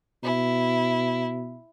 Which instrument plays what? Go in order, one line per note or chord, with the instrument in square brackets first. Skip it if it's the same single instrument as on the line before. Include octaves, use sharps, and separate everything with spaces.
[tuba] B2 [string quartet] E4